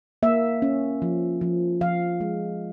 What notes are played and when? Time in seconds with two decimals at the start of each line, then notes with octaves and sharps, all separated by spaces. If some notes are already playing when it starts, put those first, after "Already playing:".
0.23 A#3 E5
0.62 C#4
1.02 F3
1.41 F3
1.81 F3 F5
2.20 G#3